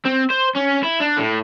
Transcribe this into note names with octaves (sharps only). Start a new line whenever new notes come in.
C4
C5
C#4
E4
D4
A2